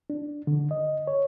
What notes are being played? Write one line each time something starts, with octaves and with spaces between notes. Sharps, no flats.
D4
D3
D#5
C#5